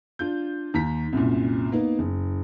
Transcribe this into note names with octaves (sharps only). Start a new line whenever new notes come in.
D4 F4 G6
D#2 A#5 B6
C2 F#2 A#2
A#3 B3 D#4
F#1